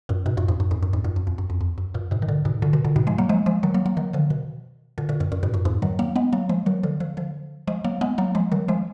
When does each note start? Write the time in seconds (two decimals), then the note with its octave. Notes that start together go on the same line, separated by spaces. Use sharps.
0.09 F#2 A#2
0.26 G#2 B2
0.37 F#2 A#2
0.48 F2 G#2
0.60 F#2
0.71 F2 G#2
0.83 F#2
0.93 F2 G#2
1.04 F#2 A#2
1.16 F#2
1.27 F2
1.38 F#2
1.50 F2
1.61 F2
1.78 F#2
1.94 F#2 A#2
2.11 G#2 B2
2.22 D#3
2.29 A#2 D3
2.45 G#2 B2
2.62 A#2 D3
2.73 B2 D#3
2.85 A#2 D3
2.96 G#2 B2
3.07 F3 G#3
3.18 F#3 A#3
3.29 F3 G#3
3.46 F3 G#3
3.63 D#3 F#3
3.74 F#3 A#3
3.86 F#3 A#3
3.97 D#3 F#3
4.13 D3 F3
4.30 B2 D#3
4.98 A#2 D3
5.09 A#2 D3
5.20 F#2 A#2
5.32 F#2 A#2
5.43 G#2 B2
5.54 F#2 A#2
5.65 F2 G#2
5.82 D#3 F#3
5.99 F#3 A#3
6.16 G#3 B3
6.33 F#3 A#3
6.49 F3 G#3
6.66 D#3 F#3
6.83 D3 F3
7.00 D3 F3
7.17 D3 F3
7.67 F3 G#3
7.84 F#3 A#3
8.01 G#3 B3
8.18 F#3 A#3
8.35 F3 G#3
8.52 D#3 F#3
8.68 F3 G#3